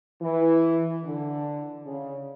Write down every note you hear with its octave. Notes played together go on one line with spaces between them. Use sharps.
E3
D3
C#3